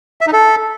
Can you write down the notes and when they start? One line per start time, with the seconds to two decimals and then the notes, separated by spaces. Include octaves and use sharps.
0.21 E5
0.27 D#4
0.33 A4